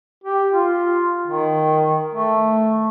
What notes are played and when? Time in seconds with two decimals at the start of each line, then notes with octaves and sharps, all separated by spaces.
0.24 G4
0.52 F4
1.27 D#3
2.15 A3